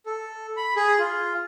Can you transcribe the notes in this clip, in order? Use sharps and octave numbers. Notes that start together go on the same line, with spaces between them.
A4
B5
G#4
F4